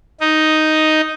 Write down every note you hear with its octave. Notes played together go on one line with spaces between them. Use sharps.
D#4